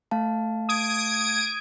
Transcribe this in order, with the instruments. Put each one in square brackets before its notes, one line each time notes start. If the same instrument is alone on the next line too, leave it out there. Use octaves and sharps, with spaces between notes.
[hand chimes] A3 F5 A5
[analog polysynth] D#6 G#6 D7